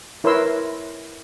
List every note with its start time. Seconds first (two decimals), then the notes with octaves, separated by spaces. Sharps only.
0.24 E4 A#4 B4 C#5 C6 E6